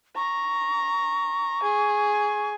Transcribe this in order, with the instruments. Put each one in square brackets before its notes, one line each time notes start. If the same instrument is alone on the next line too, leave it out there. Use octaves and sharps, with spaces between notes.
[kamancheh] A#5 [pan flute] C#6
[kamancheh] G#4